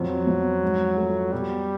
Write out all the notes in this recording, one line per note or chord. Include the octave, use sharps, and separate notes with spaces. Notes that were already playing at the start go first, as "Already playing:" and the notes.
Already playing: F2 F#3
F2
G#2
A3
B2 G3